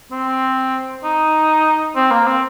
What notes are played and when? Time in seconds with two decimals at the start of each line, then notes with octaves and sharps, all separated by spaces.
0.12 C4
1.04 D#4
1.96 C4
2.11 A#3
2.27 C4